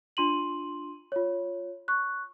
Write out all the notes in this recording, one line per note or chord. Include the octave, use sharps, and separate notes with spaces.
D4 F4 C6 D#7 F#7
F4 C#5
C#6 F#6